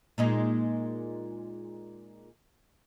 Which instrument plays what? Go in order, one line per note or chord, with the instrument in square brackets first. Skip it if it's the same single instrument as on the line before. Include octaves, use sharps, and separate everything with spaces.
[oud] A#2 G#3 D#4